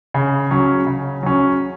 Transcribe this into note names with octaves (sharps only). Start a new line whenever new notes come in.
C#3
F#3 C#4
C#3
F#3 C#4